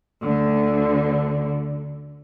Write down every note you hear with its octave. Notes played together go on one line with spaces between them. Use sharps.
D2 D3